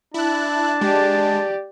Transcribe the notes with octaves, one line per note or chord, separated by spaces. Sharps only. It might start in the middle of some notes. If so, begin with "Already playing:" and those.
D4 E4 A5 F#6
G#3 G4 D5